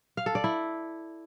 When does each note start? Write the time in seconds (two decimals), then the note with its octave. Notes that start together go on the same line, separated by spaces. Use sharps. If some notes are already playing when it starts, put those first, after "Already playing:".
0.17 F5
0.26 A4
0.35 D5
0.44 E4